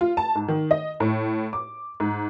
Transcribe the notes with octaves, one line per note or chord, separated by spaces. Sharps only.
F4
A5
G#2
D#3
D#5
A2
D6
G#2